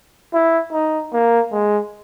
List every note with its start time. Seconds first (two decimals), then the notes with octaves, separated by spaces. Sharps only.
0.33 E4
0.73 D#4
1.13 A#3
1.52 G#3